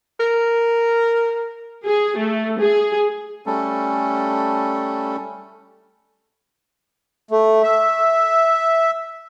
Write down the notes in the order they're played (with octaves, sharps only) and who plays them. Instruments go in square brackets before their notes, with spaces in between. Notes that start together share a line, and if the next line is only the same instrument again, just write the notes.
[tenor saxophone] A#4
[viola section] G#4
A3
G#4
[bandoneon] G3 A3 C#4 A4
[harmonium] A3
E5